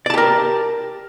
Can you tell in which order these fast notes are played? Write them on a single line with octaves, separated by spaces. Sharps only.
D5 A5 G4 A#4